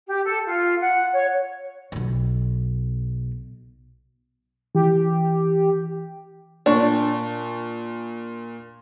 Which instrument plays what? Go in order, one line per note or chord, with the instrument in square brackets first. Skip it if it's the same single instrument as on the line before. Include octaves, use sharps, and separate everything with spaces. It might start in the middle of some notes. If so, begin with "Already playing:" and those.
[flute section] G4
A4
F4
F#5
C#5
[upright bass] B1 B2
[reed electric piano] E3 [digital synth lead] G4
[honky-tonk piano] A#2 C#6 [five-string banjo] D4